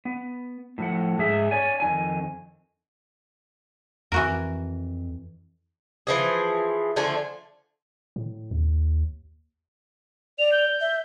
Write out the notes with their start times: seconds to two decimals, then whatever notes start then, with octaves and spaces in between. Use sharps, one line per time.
0.05 B3
0.78 A2 F3 F#5
1.19 G#2 G#4 E5
1.51 C#5 D5 G#5
1.80 F2 D#3 G#5
4.12 F2 E3 F#4 A#4
6.07 E3 F3 G#4
6.96 D3 F3 A3 G#5
8.16 A2
8.51 D#2
10.39 D5 F7
10.52 G6
10.81 E5